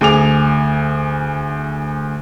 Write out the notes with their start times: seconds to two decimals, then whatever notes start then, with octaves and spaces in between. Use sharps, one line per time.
0.01 D2 G#4 D6 F7